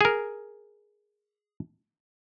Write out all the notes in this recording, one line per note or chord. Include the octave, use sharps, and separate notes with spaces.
G#4 A#4